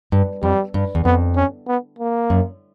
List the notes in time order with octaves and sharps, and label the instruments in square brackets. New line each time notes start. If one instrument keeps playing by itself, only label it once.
[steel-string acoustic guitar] G2
[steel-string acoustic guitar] F2 [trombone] G3
[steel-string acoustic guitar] G2
E2
[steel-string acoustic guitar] F2 [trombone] B3
[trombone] C#4
B3
A#3
[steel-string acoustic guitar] F#2